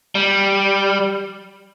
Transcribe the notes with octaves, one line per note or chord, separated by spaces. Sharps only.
G3